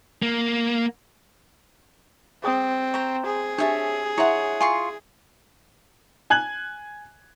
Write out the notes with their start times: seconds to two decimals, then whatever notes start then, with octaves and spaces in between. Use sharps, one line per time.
0.22 A#3
2.44 C4 G#4 G5 D#6
2.94 C5 A#5 C#6
3.26 G#4
3.58 D4 G4 C#5 E5 A5
4.18 E4 C#5 E5 F#5 C6
4.60 F4 G#5 C6 C#6
6.30 G#5 F#6 G#6 F#7